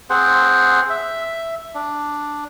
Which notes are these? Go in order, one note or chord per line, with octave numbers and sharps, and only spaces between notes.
C4 G#4 C5 F#5
E5
D4